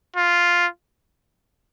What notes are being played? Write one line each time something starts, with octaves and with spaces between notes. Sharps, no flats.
F4